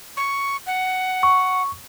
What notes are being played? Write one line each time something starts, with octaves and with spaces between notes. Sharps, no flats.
C#6
F#5
C#6